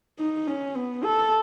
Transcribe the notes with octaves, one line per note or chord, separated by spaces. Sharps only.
D#4
C#4
B3
A4